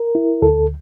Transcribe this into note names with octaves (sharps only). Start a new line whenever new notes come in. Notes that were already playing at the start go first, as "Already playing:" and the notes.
Already playing: A#4
E4
D2 A4